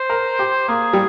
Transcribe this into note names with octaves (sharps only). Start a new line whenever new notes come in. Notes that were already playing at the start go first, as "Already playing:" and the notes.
Already playing: C5
A#4
G4
A#3 G#4
G3